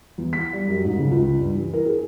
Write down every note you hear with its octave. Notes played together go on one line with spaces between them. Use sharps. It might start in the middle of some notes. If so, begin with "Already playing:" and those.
E2
B6
G3
F#2
G#2
C#3
C#2
G2
E3
A#4
G#4